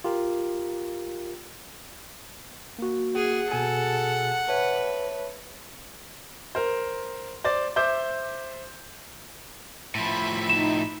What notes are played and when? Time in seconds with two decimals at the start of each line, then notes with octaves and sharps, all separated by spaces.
0.04 F4 G4 A#4
2.79 A#3 F#4
3.16 G#4 F#5
3.52 B2 G#4 A4 G#5
4.49 B4 C#5 E5 A5
6.55 A#4 C5
7.44 C5 D5 A6
7.76 C5 E5 D6 G6
9.95 A2 F3 E5 B5
10.49 D#4 E7